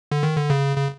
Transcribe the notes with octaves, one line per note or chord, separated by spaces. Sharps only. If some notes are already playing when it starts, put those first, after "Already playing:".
D3
D#3
D3
C#3
C#3